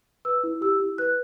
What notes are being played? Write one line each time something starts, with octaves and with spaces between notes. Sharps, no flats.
B4 E6
E4
G4 E6
E4
B4 F#6